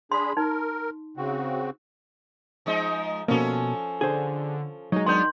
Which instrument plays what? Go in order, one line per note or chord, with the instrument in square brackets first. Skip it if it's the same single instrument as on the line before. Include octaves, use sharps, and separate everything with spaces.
[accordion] D4 G#4 B5 [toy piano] C6
[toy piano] D#4 [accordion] A#4
[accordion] C#3 C4 F#4
[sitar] F3 G#3 D#4
[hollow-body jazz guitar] B2 A#3 [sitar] F3 C#4 A4
[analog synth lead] D3 [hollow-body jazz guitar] G#4 C5
[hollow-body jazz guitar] F#3 G#3 [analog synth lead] D#4
[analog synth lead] D#3 [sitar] B3 D4 [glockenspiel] C6 G6